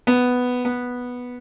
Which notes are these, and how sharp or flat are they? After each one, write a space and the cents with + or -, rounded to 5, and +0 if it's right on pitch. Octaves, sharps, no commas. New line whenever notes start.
B3 +5
B3 -5